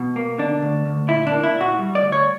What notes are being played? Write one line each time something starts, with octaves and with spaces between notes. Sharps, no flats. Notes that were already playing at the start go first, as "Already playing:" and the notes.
Already playing: B2
A#3
D3 D4
D2
D2
A#2 E4
D4
A#3
E4
A#2
F#4
G3
D5
D2
C#5